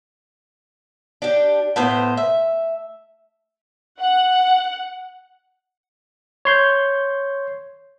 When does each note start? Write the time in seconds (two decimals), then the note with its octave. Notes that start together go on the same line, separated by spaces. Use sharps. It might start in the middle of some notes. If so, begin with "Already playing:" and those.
1.22 D4 G4
1.76 A2 B3 C5
2.17 E5
4.00 F#5
6.45 C#5 C6 G6